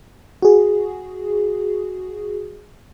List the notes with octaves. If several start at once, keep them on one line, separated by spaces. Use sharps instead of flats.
F#4 G#4